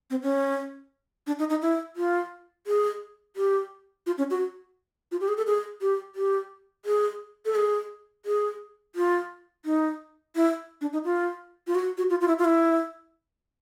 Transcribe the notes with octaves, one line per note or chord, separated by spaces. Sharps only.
C4
C#4
D4
D#4
D#4
E4
F4
G#4
G4
F4
C#4
F#4
F4
G4
G#4
A4
G#4
G4
G4
G#4
A4
G#4
G#4
F4
D#4
E4
D4
D#4
F4
F4
F#4
F#4
F4
F4
E4
F4
E4